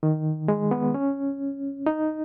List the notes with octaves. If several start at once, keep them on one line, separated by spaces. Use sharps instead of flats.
D#3
G#3
B3
C#4
D#4